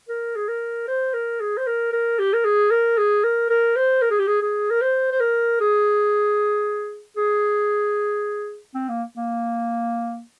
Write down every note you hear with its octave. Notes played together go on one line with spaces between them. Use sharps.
A#4
G#4
A#4
C5
A#4
G#4
C5
A#4
A#4
G4
A#4
G#4
A#4
G#4
A#4
A#4
C5
A#4
G#4
G4
G#4
G#4
A#4
C5
C5
A#4
G#4
G#4
C4
A#3
A#3